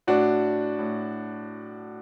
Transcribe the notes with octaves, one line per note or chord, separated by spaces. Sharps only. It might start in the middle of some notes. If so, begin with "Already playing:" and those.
A2 D4 F#4
A2